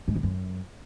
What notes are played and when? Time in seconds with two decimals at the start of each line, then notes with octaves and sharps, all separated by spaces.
0.08 G#2
0.15 E2
0.23 F#2